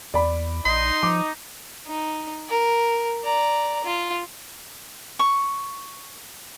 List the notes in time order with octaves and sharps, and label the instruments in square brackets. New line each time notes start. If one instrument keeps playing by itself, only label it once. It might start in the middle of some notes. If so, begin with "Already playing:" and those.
[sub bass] E2 [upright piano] D5 B5
[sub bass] A#1 [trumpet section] D#4 [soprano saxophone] C6
[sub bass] F3 [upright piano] D6
[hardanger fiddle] D#4
A#4
D5 A#5
F4
[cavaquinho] C#6